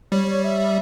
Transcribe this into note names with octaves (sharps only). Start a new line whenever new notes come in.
G3 C#5
C#5
E5